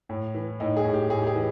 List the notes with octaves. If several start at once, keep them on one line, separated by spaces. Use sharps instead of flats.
A2
E3
A2 D#4
G#4
A2
G4
A2 G#4
G4
G#4
E3